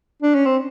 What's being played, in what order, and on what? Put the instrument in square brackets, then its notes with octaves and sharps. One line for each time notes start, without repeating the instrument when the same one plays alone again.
[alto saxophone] D4
C#4
C4